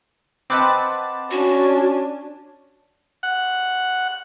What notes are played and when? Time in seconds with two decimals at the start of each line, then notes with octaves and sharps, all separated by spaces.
0.50 C4 B4 D#5 F#5 A5 D6
1.31 C#4 D4 F#4
3.23 F#5